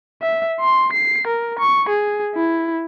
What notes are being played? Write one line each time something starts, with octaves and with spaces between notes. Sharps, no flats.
E5
C6
C7
A#4
C#6
G#4
E4